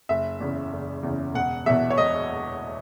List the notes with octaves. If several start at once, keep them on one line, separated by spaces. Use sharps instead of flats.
F#1 E5
E2 C#3
F#1
E2 C#3
E1 F#5
E2 B2 E5
C#5
E1 D#5